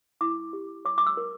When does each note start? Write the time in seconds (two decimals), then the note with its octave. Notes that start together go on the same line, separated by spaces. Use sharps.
0.21 E4 D6
0.53 G4
0.85 C#5 D6
0.98 D6
1.07 E6
1.17 A#4